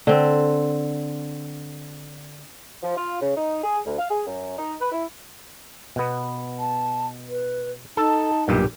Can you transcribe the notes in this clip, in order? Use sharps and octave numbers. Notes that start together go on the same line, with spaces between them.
D3 C4
F3
F4
C#3
D#4
G#4
D2
F5
G#4
F#2
D#4
B4
E4
B2 B3
A5
B4
D#4 A4 A5
B1 G2 A#2 G4